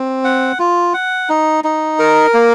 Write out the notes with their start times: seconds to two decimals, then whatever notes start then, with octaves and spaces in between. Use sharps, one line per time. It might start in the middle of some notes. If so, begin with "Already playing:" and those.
Already playing: C4
0.24 F#5
0.59 F4
0.94 F#5
1.29 D#4
1.64 D#4
1.99 A#4
2.34 A#3